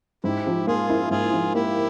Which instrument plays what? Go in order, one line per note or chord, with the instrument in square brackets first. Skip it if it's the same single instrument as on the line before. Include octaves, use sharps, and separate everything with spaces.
[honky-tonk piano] G#2 [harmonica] E4 G4
[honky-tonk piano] F3
[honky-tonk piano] A#3 [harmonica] F4 G#4
[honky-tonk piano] E4
[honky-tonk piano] G#2 [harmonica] F4 G#4
[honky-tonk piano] F3
[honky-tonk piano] A#3 [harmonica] E4 G4